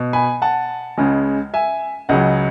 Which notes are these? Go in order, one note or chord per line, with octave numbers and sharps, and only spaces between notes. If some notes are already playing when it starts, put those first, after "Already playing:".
Already playing: B2
G#5 B5
F#5 A5
C#2 C#3 G#3
E5 G#5
C#2 C#3 F#3 D#5 F#5